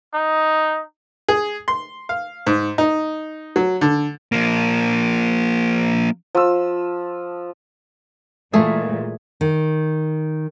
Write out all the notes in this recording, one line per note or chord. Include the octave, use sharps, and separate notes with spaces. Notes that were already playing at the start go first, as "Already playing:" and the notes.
D#4
G#4
C6
F5
G#2
D#4
F#3
D3
F3 A#3
F3 E6
A#2 E3 G#3 A3 G#4
D#3